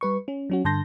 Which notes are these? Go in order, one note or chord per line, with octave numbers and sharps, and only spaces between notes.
G3 B4 C#6
C#4
F#3 C#4 F#4
G2 D3 A5 C6 G6 A#6